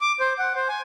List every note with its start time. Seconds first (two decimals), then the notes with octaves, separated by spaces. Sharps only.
0.01 D6
0.20 C5
0.39 F#5
0.55 C5
0.69 G#5